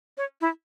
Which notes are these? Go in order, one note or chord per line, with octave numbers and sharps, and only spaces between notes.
C#5
E4